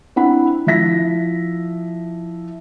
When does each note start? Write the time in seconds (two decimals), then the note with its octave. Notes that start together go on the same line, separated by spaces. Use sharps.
0.16 C4 D4 E4 F#5 B5
0.67 F3 E4 E5 A#6 B6